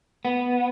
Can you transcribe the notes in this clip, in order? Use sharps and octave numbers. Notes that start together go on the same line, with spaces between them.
B3